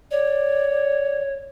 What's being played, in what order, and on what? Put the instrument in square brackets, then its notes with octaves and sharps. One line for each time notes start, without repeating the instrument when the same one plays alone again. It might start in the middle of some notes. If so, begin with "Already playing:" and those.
[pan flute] C#5 [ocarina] D5